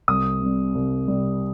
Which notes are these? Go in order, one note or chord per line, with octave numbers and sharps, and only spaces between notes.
C2 D#6
C3 G3
C2
C3 G3